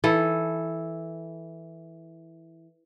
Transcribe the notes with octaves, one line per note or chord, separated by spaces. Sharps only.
E3 A4